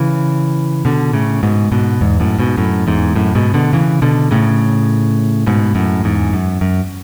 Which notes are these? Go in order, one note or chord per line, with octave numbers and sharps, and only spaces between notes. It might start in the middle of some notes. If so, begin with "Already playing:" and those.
Already playing: C#3 E3
B2 D3
A2 C#3
G#2 B2
G#2 B2
E2 G#2
F#2 A2
G#2 B2
F#2 A2
E2 G#2
F#2 A2
G#2 B2
B2 D3
C#3 E3
B2 D3
A2 C#3
G#2 B2
F#2 A2
E2 G#2
F#2
F#2